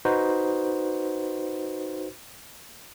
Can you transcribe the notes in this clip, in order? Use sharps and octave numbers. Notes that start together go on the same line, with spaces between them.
D#4 F#4 B4 C5